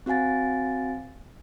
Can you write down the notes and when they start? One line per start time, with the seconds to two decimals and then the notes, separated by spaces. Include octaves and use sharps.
0.06 C4 F#4 F5 G#5 A6